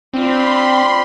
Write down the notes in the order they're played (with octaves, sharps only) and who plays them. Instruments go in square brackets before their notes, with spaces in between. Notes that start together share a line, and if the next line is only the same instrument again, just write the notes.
[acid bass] C4 [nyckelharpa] D4 F4 [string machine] B5 C6